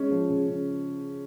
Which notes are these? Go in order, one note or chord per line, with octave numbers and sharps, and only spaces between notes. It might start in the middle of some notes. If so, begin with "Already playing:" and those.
Already playing: G#3 C#4
F3
C#3
C#3